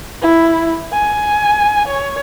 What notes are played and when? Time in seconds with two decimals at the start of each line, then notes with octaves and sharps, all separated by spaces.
0.21 E4
0.92 G#5
1.87 C#5